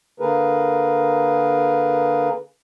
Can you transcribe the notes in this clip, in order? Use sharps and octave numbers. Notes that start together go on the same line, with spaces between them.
D3 A#3 G#4 A#4 B4